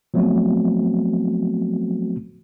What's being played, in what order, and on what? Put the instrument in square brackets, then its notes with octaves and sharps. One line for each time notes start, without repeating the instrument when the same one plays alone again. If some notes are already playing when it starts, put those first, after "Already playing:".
[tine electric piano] F3 F#3 A3 B3 C4 F#4